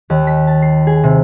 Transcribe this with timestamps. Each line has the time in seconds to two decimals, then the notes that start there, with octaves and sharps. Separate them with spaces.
0.10 D#2
0.27 B6
0.47 A5
0.62 C7
0.87 G#4
1.03 C3